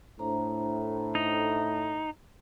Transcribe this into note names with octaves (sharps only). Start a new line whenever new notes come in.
A2 D4 C5 A#5
D#4